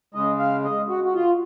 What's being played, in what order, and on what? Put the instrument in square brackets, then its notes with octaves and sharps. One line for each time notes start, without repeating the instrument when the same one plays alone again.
[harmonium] C#3 G#3 D#5
F5
D#5
F#4
F#4
F4